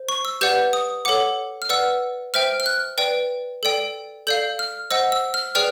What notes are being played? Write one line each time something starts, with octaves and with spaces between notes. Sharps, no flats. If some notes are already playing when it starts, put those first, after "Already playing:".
Already playing: C5
C#6
E6
G4 B4 D5 F#5 G6
D#6
A4 C#5 F#5 D6
F6
B4 D5 F#5 E6
C5 E5 G5 F6
F6
F#6
B4 D5 G5
A4 D5 G5
A4 D5 F5 G6
F6
C5 D#5 F#5 E6
E6
F6
G#4 B4 D5 G5 F6